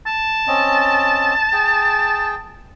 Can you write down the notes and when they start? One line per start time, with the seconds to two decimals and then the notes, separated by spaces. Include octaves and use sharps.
0.06 A5
0.47 C4 C#4 D#5
1.53 G#4 G5